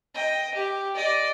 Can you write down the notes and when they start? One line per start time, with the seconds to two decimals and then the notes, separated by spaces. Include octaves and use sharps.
0.14 D#5 G5
0.54 G4
0.95 D5 D#5